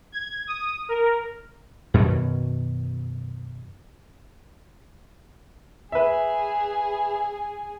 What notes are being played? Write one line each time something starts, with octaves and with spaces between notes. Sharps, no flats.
G#6
D#6
A#4
F#2 B2 D#3 F#3
G#4 B4 E5